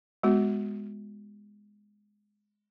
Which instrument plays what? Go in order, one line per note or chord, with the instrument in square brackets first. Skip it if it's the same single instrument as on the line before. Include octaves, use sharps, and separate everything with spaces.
[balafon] G#3 B3 F#4